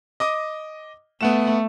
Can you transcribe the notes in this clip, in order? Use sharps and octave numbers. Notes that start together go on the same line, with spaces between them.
D#5 D6 D#6
A3 B3 F#5 E7